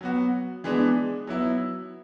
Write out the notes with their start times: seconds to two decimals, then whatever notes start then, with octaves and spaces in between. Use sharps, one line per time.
0.01 F#3 B3 F#4
0.64 E3 G#3 B3 D4
1.27 F#3 B3 E4